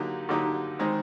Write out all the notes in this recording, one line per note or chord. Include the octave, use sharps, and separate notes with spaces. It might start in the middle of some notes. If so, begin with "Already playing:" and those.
Already playing: D3 F#3 A#3 D#4 G4
D3 F#3 A#3 D#4 G4
D#3 G#3 C4 D#4